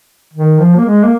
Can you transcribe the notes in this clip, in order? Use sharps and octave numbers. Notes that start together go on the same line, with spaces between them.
D#3
F3
A#3
G#3
A#3